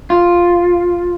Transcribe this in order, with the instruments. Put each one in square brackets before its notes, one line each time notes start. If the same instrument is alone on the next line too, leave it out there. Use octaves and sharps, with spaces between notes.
[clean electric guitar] F4